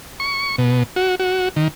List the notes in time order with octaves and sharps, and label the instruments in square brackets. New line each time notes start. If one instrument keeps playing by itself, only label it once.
[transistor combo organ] C#6
B2
F#4
F#4
D#3